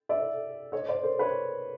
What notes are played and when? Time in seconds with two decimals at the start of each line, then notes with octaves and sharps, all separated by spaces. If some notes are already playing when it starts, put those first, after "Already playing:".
0.09 D5 E5
0.72 C#5 D#5
0.89 C5 D5
1.03 A#4 C5
1.19 B4 C#5